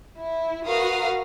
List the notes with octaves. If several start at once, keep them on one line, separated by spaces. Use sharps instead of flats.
E4
F#4 A#4 B4 F5 D#6